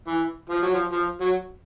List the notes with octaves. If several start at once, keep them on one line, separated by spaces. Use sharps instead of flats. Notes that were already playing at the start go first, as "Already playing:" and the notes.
E3
F3
F#3
F3
F3
F#3